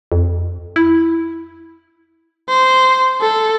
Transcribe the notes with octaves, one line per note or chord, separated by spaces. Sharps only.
F2
E4
C5
A4